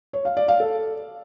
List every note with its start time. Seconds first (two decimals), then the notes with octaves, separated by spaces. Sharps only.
0.13 C#5
0.25 F5
0.37 D5
0.48 F5
0.60 A4